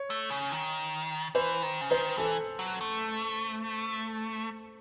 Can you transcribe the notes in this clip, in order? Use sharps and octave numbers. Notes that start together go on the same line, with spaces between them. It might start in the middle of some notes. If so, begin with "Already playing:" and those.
Already playing: C#5
A3
C#3
D#3
E3 C5
D#3
C#3
D#3 C5
E3 A4
F#3
A3